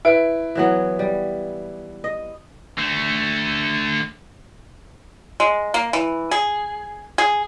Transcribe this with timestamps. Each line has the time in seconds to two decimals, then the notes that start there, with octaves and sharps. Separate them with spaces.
0.05 E4 B4 D7
0.55 E3 F#3 B3
0.99 G3
2.04 D#5
2.78 D3 A3
5.40 G#3
5.74 A#3
5.93 E3
6.31 G#4
7.18 G#4